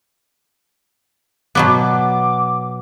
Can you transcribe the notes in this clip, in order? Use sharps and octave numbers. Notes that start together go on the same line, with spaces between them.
B2 F#3 B3 D6